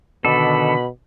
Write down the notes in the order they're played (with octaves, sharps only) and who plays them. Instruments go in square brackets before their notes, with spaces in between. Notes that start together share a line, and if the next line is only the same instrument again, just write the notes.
[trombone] B2 [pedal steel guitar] D3 D#3 D5 [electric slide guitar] A4 [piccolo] B5